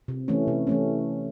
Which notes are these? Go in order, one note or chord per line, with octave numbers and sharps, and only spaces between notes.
C3
E3 A3 C#4
C3
E3 A3 C#4